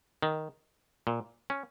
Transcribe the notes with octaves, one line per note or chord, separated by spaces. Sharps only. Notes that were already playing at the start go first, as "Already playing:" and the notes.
D#3
A#2
C#4